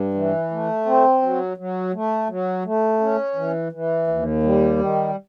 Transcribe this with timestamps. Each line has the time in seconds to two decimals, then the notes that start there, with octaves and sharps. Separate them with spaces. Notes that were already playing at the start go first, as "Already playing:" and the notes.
Already playing: G2
0.14 E3
0.51 A3
0.86 C4
1.22 F#3
1.57 F#3
1.93 A3
2.29 F#3
2.65 A3
3.00 C#4
3.36 E3
3.72 E3
4.07 D#2
4.43 G3
4.78 D#3